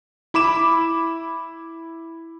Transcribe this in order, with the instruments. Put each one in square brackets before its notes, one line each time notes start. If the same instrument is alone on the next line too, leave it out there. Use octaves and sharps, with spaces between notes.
[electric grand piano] E4 B5 D6 E7